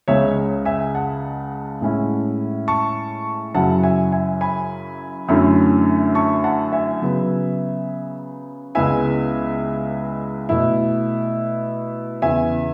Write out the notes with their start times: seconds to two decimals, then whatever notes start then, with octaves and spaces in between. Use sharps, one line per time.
0.08 C#2 C#3 G#3 C#5 E5
0.65 E5 G#5
0.95 F#5 A5
1.81 A2 G#3 C#4 E4
2.68 A5 C#6
3.55 F#2 C#3 F#3 C#4 E4 F#5 A5
3.83 E5 G#5
4.12 E5 G#5
4.41 G#5 B5
5.28 F#2 D3 A3 C#4 E4
6.15 A5 C#6
6.44 F#5 A5
6.73 E5 G#5
7.02 C#3 F#3 B3
8.75 C#2 C#3 G#3 B3 E4 E5 G#5
10.49 B2 A3 E4
12.22 E2 C#3 E3 E5 G#5